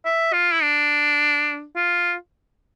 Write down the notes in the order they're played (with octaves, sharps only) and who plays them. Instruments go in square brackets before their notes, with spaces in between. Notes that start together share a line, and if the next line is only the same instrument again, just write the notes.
[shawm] E5
F4
E4
D4
F4